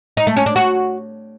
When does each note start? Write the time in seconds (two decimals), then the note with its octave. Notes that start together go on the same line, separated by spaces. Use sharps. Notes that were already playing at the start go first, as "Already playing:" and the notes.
0.17 D#4
0.27 A3
0.36 C#4
0.46 D4
0.56 F#4